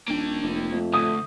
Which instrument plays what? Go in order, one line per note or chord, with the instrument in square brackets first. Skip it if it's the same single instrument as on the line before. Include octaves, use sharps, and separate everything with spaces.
[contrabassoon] D#1 [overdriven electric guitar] A#3 G5 [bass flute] D4
[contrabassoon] F1
[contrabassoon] F2 [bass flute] A3
[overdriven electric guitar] D2 [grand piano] D#6